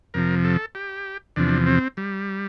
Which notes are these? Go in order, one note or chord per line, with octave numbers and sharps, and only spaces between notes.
F2 C3 F3 A#4
A4
G4
E2 C3 F3 D4
C4
G3